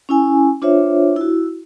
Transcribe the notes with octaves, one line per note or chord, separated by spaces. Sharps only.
C#4 E4 G#5
D4 F4 C5 C#5 E5
E4 F#4